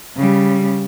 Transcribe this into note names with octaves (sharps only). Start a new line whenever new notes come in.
C#3 G3